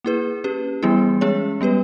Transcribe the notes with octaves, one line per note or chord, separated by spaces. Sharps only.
A#3 E4 G#4 B4
C#4 G4 B4
E3 G3 B3 E4 G#4
G#3 C#4 G#4 C#5
G3 B3 G4 B4